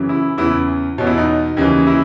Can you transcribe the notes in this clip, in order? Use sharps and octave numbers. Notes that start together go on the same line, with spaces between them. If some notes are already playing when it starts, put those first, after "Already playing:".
Already playing: F#2 C#3 E3
E4
E2 C#3 E3 E4
E2 B2 C#4
E4
D#4
D#2 C#3 E3
E4